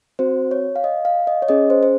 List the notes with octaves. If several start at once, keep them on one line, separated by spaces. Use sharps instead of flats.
C4 F#4 C5
C#5
F5
D#5
F5
D#5
C#5
C#4 G#4 D#5
C5
C5